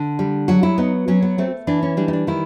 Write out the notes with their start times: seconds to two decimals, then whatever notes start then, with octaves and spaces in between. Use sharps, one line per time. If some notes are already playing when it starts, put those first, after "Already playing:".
Already playing: D3
0.19 G3
0.48 F#3 F#4
0.63 E4
0.78 B3 D#4
1.08 F#3 C#4
1.23 B3
1.38 A3 C4
1.67 E3 D4
1.82 C#4
1.97 G3 D4
2.08 D#4
2.13 D4
2.27 D#3 E4